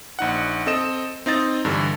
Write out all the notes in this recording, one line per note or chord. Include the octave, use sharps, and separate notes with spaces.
A#1 D#4 F#5
C4 A4 D#5 E7
C4 D#4 D#5 A6
G2 D3 E3